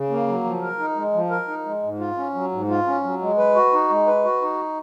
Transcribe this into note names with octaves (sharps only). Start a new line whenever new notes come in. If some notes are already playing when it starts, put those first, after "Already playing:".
Already playing: C#3
A#3
F#3
F3
A#4
D#4
G#3
F3
A#4
D#4
G#3
G#2
F4
C#4
F#3
G#2
F4
C#4
F#3
G#3
B4
F#4
D#4
G#3
B4
F#4
D#4